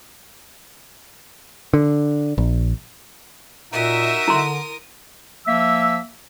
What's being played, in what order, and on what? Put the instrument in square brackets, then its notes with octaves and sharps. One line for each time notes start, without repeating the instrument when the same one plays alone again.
[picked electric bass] D3
A#1
[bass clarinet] A#2 [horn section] D#4 F#4 E5 [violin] A#4 D#6
[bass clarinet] D3 [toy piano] E4 C6
[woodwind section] F3 A#3 E5 E6